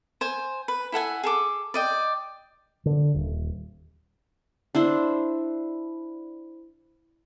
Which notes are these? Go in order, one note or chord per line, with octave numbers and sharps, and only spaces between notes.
C5 G#5
B4
E4 A4 F#5 G#5
G#4 A4 D6
D5 D#5 G5
D3
D#1
D4 E4 C5